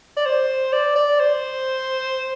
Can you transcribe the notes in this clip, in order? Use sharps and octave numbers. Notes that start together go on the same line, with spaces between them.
D5
C5
D5
D5
C5